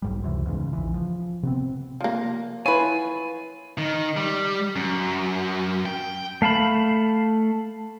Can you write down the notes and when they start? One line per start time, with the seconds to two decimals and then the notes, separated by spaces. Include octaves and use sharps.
0.02 B1 G#2 G3
0.23 C#2 F#2 C3 E3
0.46 E2 G#2 C#3
0.73 A#1 E3
0.94 F3
1.43 C3 B3 C4
2.01 F3 A#3
2.66 E4 F4 B4 C#5 G#5
3.78 D#3
4.17 G3
4.76 F#2
5.86 G5
6.42 A3 F5 A5 B5